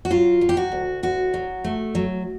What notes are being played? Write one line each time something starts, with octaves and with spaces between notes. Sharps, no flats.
F#4
F#3 F4
F#3
G4
F#4
D2
D2 F#4
F#3
A3
F#3